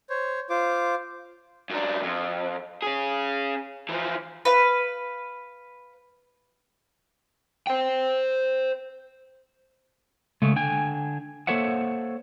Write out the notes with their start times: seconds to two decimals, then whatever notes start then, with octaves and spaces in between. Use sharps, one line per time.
0.10 C5 C#5
0.50 F4 C5 D6
1.70 F#2 D4
2.03 F2
2.82 C#4 G#4
3.89 E3 F3
4.45 B4 F5
7.67 C5 G5
10.42 C#3 G#3 A3
10.56 D3 G5 G#5
11.47 A#3 A4 C5 C#5 E5 F#5